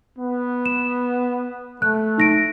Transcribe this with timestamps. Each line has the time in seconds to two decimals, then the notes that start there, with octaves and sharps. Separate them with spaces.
0.18 B3
0.66 E7
1.82 A3 F#6
2.18 D#4 A#6 D7